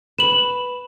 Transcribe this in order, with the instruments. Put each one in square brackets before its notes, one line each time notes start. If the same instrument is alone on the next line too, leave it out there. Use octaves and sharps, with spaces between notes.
[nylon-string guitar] B4 [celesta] E7 F#7